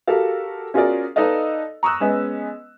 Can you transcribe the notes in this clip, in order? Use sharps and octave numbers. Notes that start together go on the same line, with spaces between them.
F#4 G4 A4 A#4 F5
C#4 F4 F#4 G#4 A#4 D5
D#4 A4 B4 D5 D#5 F5
A#5 C#6 D#6 E6 F#6
G#3 B3 C#4 D#5